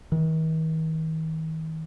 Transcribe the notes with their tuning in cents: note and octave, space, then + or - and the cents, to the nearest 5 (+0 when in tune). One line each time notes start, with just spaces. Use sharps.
D#3 +45